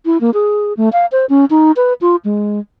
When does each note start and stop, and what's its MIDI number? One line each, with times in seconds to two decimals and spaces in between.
0.06 0.18 64
0.21 0.31 58
0.34 0.73 68
0.77 0.89 57
0.93 1.06 77
1.12 1.26 72
1.29 1.45 61
1.50 1.72 63
1.76 1.93 71
2.01 2.16 65
2.25 2.60 56